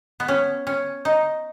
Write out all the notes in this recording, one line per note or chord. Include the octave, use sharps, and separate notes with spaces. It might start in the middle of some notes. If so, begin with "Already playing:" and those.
B3
C#4
C#4
D#4